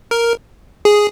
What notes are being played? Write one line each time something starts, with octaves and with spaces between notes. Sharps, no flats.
A#4
G#4